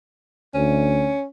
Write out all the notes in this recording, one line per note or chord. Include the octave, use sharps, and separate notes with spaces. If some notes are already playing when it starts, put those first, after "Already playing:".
D2 C#4